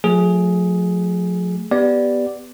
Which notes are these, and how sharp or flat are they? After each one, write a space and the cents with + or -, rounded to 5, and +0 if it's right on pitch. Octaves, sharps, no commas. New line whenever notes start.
F3 +45 A3 +0 G#4 +10
B3 +0 G4 +0 D5 +0